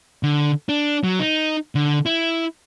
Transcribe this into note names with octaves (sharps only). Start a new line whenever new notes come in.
D3
D4
F#3
D#4
D3
E4